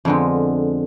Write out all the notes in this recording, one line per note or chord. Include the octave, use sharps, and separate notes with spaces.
F2 D3 G#3 B3